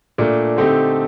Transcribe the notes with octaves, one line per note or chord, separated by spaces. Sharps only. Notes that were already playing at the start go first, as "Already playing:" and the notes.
A#2 A3 D4
D3 A3 C4 D#4 G4